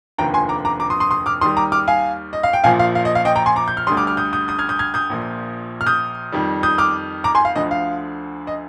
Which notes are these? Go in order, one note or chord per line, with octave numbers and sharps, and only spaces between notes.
F1 D#2 D3 F3 G5 A#5
G#5 C6
A#5 D6
A#5 D6
A#5 D6
C6 D#6
C6 D#6
C6 D#6
D6 F6
D#2 D#3 G3 C6 D#6
A#5 D6
D6 F6
F5 G#5
D#5
F5
G5
A#1 A#2 F3 F5 G#5
F5
F5
D#5
F5
D#5 G5
G5 A#5
G#5 C6
A#5 D6
G6
F6
D2 D3 G3 C6 D#6
D6 F6
D6 F6
D#6 G6
D#6 G6
D#6 G6
F6 G#6
D#6 G6
F6 G#6
D#6 G6
A#1 A#2 F3
F6
D#6 G6
F2 D#3 G3
D#6 G6
D6 F6
A#5 D6
G#5 C6
F5
D2 D3 F3 D#5
F5
D#5